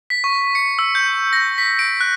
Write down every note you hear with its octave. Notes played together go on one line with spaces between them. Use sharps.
B6
C#6
C#7
E6
G6
A#6
B6
D7
F#6